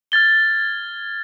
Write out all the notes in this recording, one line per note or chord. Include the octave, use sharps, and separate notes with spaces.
F6 G#6 A6 G7